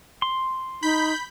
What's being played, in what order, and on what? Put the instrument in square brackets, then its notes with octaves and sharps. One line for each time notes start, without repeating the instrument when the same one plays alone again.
[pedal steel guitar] C6
[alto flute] D#4 [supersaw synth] B5 G6 B6